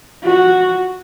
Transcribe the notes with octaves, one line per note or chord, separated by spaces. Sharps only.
F#4